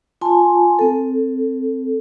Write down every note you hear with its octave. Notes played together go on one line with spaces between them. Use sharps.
F4 G#5 A5 C6
C4 A4